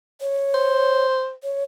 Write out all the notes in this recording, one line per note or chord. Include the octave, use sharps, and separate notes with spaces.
C#5
C5
C#5